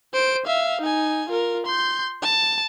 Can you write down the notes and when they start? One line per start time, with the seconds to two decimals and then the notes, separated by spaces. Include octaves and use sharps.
0.13 C5 D7
0.46 E5 F5
0.81 D#4 G#5
1.29 F4 A#4
1.66 C6 G6
2.22 A5